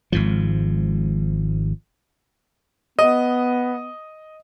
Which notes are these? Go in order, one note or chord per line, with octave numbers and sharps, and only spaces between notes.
G#1 G#2 F3
B3 D#5